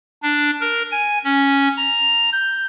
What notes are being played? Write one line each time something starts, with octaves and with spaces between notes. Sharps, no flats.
D4
A#4
G#5
C#4
A#5
G6